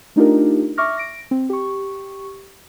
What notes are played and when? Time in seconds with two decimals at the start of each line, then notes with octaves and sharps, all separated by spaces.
0.16 A3 D4 D#4 F4 G4 A#4
0.77 E5 C#6 D6 F6 A#6
0.97 A#6 D7
1.31 C4
1.50 G4 C#6